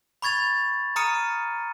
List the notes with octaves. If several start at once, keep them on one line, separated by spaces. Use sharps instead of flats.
B5 C#6 G#6 A6 F7
A#5 D#6 F6 C#7 D#7